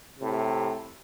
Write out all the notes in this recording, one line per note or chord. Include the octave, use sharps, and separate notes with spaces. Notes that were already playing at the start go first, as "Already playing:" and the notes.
A2 C3